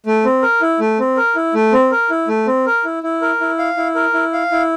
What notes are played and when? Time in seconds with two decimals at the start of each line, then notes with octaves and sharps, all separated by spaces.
0.06 A3
0.25 C4
0.43 A#4
0.61 E4
0.80 A3
0.99 C4
1.17 A#4
1.36 E4
1.54 A3
1.72 C4
1.91 A#4
2.10 E4
2.28 A3
2.47 C4
2.66 A#4
2.85 E4
3.03 E4
3.22 A#4
3.41 E4
3.58 F5
3.77 E4
3.95 A#4
4.14 E4
4.33 F5
4.51 E4